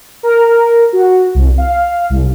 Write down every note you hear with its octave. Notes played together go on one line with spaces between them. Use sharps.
A#4
F#4
C2
F5
C2